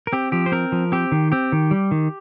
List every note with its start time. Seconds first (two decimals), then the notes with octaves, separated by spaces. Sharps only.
0.07 A#4
0.13 C4 G4
0.32 F3 G4
0.46 C5
0.52 C4 A#4
0.72 F3
0.92 C4 G4
1.12 D#3
1.32 C4 G4
1.52 D#3
1.71 G3
1.91 D#3